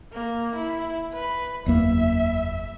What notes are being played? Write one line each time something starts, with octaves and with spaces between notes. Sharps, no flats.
A#3
E4
B4
F#1 E2 A#3 E5